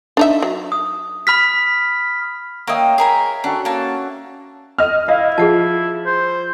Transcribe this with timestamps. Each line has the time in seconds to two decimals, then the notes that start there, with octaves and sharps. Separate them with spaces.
0.17 D4 D#4 E5
0.42 F#3
0.72 D#6
1.27 B5 F6 B6
2.67 A#3 C#5 D#5 E5 G5
2.98 G#4 A#4 B5
3.44 C#4 D4 F#4 A4
3.65 A#3 A5
4.78 D#5 F6
5.08 E4 D#5 F5
5.38 F3 G#4 F#5 A5
6.06 C5